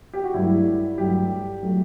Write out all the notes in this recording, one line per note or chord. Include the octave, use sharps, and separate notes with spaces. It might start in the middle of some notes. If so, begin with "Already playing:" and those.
G4
F#4
G2 F#3 A3 E4
G2 F#3 A3 G4
F#3 A3